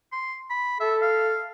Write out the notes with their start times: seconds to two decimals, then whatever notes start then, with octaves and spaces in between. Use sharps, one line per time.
0.12 C6
0.50 B5
0.80 A4 E5
1.01 F5